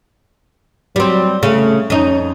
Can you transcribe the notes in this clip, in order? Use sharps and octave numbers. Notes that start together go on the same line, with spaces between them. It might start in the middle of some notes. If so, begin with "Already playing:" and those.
F#3 G3 C4
C#3 A3
F2 C#4 D#4